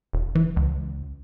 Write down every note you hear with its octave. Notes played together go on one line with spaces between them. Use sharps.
E1
E3
C#2